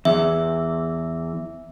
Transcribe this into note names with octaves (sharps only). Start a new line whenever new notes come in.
E2 E5